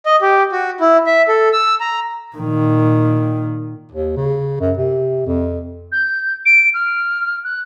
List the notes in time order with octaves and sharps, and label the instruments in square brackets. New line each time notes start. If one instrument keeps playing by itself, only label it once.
[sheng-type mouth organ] D#5
G4
F#4
E4
E5
A4
E6
A#5
[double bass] A#2 D#3
[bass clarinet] D#2
C#3
F#2
C3
F2
[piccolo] G6
D7
F6
F#6